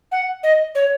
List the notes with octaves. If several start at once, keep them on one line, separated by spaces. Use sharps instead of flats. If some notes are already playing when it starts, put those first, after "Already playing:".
F#5
D#5
C#5